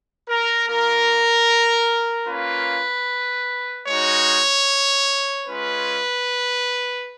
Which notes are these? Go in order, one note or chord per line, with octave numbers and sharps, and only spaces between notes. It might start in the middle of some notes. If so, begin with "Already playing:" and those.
A#4
A#3 F4 A#4
A#3 C#4 F4 B4
G#3 D#4 F#4 C#5
G#3 C#4 F4 B4